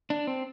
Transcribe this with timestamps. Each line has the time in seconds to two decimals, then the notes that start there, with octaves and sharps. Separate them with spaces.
0.10 D4
0.27 C4